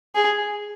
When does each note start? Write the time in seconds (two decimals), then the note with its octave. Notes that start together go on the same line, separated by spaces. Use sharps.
0.15 G#4